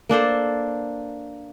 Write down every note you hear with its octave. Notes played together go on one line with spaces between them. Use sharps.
A#3 D4 A4 C5